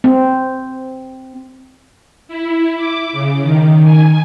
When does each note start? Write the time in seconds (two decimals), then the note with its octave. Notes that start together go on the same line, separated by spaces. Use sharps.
0.04 C4
2.28 E4
2.76 D6
3.12 C#3
3.42 D#3
3.84 G#5